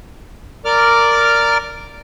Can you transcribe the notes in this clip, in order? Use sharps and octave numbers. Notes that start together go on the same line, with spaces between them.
A#4 D5 D6 F6